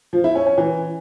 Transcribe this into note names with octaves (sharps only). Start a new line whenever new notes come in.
F3
E4
C#4
C#4
E3